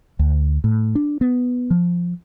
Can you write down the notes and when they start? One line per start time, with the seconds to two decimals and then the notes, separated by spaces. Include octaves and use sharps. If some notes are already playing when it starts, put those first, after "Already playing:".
0.19 D2
0.64 A2
0.95 D4
1.21 B3
1.70 F3